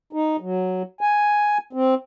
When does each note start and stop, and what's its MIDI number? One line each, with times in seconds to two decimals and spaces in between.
0.13 0.37 63
0.40 0.83 54
1.01 1.58 80
1.73 1.95 60